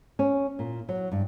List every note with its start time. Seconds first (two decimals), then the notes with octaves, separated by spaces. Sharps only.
0.19 C#4
0.59 A#2
0.89 F#3
1.12 G2